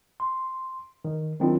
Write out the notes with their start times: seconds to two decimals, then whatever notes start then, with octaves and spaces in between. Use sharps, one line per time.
0.20 C6
1.05 D#3
1.40 D#3 F#3 C4 D4 E4 F4